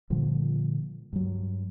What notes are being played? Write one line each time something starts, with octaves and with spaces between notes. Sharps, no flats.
A#2 D3 F3 G3
G2 F#3